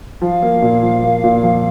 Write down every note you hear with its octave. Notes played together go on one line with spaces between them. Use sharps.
F3 F5
A#3
A#2
F3
A#3
A#2
F2